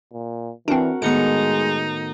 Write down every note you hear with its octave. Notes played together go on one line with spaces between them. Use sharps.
A#2
E3 C4 D4 F#4 A#4
A2 D#3 G#3 B3 D#4 C#7